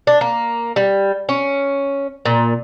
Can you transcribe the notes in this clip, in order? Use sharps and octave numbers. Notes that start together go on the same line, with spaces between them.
D4
A#3
G3
C#4
A#2